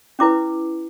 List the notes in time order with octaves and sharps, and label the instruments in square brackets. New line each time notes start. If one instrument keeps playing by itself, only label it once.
[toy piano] C#4 E4 B4 D6